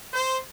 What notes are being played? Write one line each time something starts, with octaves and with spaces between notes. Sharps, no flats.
C5